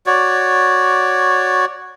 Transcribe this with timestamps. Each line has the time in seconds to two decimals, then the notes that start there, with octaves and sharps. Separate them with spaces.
0.06 F#4 C#5 D5